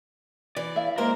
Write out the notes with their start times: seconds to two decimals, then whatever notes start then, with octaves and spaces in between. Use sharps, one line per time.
0.57 E3 D5
0.76 E5 F5
0.98 G#3 A#3 A#4 C5